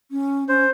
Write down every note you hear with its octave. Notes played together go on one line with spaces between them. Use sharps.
C#4
C#4 C5